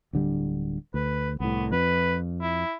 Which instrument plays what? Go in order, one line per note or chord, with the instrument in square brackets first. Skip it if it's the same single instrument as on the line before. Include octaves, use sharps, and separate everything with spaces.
[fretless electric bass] D1 D3 G3
[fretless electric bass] D2 [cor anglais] B4
[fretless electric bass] C2 A2 [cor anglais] B3
[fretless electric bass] F2 [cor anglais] B4
[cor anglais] E4